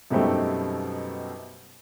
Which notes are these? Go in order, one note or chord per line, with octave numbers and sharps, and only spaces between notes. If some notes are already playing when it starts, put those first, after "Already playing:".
F#2 B2 G3 A3 C4 D#4